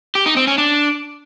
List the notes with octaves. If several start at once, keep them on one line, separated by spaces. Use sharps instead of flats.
G4
D#4
C4
C#4
D4